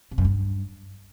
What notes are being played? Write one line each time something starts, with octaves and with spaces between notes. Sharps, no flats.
C3
F#2
G2